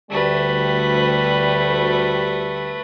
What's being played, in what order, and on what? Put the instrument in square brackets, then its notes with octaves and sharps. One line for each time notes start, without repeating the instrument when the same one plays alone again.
[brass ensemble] D2 G3 [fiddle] A3 B4